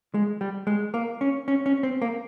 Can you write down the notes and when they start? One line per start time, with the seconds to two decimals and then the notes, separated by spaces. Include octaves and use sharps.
0.14 G#3
0.41 G3
0.67 G#3
0.94 A#3
1.21 C#4
1.48 C#4
1.66 C#4
1.83 C4
2.02 A#3